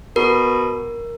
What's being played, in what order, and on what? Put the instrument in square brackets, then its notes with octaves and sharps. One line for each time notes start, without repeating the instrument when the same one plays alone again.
[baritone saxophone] B2 [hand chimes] A#4